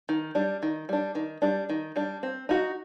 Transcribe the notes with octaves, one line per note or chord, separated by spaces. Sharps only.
D#3
G3 D4
D#3
G3 D4
D#3
G3 D4
D#3
G3 D4
C4
D#4 F#4